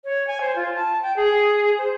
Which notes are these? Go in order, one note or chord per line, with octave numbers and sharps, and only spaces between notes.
C#5
G#5
C5
F4
A5
G5
G#4
C5